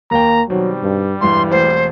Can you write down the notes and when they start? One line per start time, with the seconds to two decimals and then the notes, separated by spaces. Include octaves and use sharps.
0.11 D#2 A#3 G5 A#5
0.50 B2 D#3 F#3 G3 C4
0.83 G2
1.21 E1 G2 E3 C6
1.51 E1 A3 C4 C5